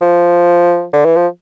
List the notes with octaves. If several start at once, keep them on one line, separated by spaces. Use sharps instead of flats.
F3
D3
E3
F3